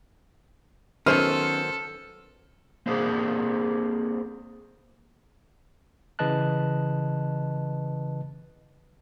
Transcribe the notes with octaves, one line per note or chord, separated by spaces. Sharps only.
D#3 F#3 B3 C#4 A4 C5 F6
A#3 C4 D4 G#4 C5
C#3 E3 B4 D#5 A5 F#6